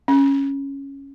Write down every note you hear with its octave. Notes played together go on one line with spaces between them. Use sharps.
C#4